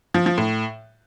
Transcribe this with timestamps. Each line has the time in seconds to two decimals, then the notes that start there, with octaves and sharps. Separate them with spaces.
0.14 F3
0.26 F3
0.38 A2